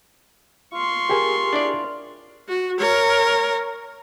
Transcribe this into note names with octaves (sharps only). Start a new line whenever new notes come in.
F4 C6 C#6
G4 G#4 A#4
D4 E4 D5
F#4
A#4 C#5